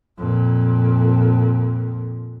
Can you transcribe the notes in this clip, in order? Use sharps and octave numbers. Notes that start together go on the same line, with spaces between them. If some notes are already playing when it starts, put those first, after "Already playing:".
F2 A#2